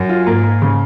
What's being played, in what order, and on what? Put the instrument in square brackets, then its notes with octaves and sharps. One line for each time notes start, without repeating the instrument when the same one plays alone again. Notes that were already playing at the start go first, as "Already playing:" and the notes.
Already playing: [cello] F#2
[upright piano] F4
[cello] G#2 [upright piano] A#3
[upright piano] A#3
C#3